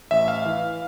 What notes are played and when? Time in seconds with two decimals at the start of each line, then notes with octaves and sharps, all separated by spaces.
0.11 A1 E5
0.28 F5
0.46 E3